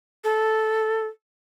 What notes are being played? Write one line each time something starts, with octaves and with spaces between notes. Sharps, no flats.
A4